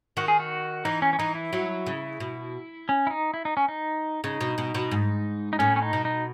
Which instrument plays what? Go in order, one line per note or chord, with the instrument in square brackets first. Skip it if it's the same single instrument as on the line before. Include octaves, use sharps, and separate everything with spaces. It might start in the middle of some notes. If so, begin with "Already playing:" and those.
[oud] D#3 [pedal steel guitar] F#4
[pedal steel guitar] G#4
F#4
[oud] E3 [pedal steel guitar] D#4
[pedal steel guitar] C#4
C#4
[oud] E3 [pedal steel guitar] D#4
[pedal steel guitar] E4
[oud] F#3
C#3
B2
[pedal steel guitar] C#4
E4
D#4
E4
D#4
C#4
D#4
[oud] C#3 [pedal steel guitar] D#4
[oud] B2
B2
B2
G#2
[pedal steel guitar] D#4
[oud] A2 [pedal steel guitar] C#4
[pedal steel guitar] C#4
D#4
[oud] B2
[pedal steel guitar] D#4